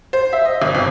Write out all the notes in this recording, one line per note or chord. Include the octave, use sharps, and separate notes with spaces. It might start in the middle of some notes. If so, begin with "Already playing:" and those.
C5
E5
D#5
G#1
G1